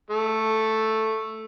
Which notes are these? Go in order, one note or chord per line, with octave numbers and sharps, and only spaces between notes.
A3